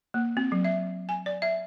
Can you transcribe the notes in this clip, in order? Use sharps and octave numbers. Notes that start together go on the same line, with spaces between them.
A#3
C4
F#3
E5
G#5
D5
E5